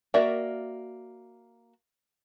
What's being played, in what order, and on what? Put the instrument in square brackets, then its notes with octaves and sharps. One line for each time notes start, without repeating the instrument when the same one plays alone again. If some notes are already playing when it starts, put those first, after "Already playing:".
[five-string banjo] A#3 F#4 A#4 D5 E5